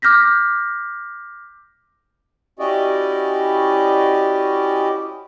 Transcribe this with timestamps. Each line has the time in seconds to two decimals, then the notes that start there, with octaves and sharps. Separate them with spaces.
0.02 D6 F6 G6 A#6 B6
2.59 C#4 E4 F#4 G4 D5 D#5